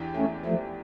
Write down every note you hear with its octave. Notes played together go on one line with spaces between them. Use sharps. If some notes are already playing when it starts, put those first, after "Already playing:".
Already playing: E2 E3 D4 G4
A3 C#4
F3 A3